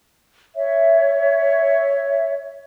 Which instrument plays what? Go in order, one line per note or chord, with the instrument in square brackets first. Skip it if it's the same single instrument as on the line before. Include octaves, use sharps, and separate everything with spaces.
[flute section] C#5 E5